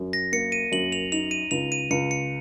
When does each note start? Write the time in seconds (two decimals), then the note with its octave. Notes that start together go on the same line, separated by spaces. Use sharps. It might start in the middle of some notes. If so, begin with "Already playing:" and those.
Already playing: F#2
0.13 A#6
0.32 A#3 C#7
0.52 D#7
0.72 F#2 F#7
0.92 F7
1.12 D#4 F7
1.31 D#7
1.51 C#2 F7
1.72 D#7
1.91 C#2 C#7
2.11 C#7